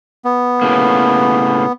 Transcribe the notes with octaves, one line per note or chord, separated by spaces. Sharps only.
B3
A2 C#3 A#3